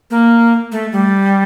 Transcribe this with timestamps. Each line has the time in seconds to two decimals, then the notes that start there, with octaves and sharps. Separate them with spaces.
0.11 A#3
0.72 A3
0.92 G3